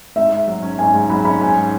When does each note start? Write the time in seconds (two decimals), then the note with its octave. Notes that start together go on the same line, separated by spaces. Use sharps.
0.16 G#2 E5
0.32 G#2
0.47 F#3
0.63 C#4
0.78 G#2 G#5
0.94 G#2
1.10 F#3 B5
1.25 C#4 B5
1.41 G#2 G#5